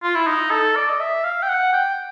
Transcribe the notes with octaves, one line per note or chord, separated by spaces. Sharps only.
F4
E4
D#4
A4
D5
D#5
E5
F5
G5
F#5
G5